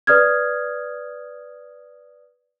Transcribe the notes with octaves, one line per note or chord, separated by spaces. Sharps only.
B4 D5 D#6 F6 G#6